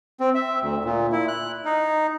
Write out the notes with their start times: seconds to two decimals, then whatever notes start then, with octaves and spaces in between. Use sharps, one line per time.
0.20 C4
0.35 E5
0.62 D2
0.85 A#2
1.12 E4
1.28 F#6
1.65 D#4